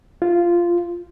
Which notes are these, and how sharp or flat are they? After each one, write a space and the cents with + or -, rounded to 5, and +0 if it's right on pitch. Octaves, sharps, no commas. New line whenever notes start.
F4 -10